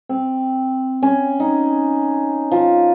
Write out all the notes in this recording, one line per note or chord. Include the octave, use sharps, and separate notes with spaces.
C4
C#4
D#4
F3